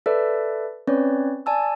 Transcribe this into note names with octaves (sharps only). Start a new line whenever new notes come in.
A4 B4 D5 E5
C4 C#4 B4 C#5 D5
D5 G#5 A5 E6